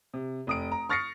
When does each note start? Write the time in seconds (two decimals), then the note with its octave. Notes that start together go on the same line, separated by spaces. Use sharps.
0.14 C3
0.47 F1 D#6 D7
0.72 A#5
0.89 C#6 F6 A6 A#6 C7 C#7